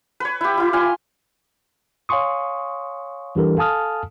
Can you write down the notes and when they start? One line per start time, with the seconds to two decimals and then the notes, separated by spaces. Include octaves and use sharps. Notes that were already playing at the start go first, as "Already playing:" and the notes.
0.20 B4 C#5
0.41 E4 G4
0.57 E4 F4
0.73 F5 G#5 C6
2.09 C#5 F5 G#5 C6 C#6 D#6
3.36 E3 G3 D4 G4 A4 A#4
3.57 A4 F5 G#5 A5 D#6 F6